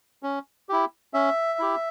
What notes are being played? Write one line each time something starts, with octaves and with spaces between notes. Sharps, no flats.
C#4
E4 G4
C#4 E5
E4 G4